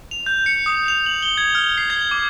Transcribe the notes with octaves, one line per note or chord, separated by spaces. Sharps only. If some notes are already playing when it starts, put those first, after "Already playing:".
F7
G6
C#7
D#6
F7
F#7
G7
G#6
F6
C7
G#6
D6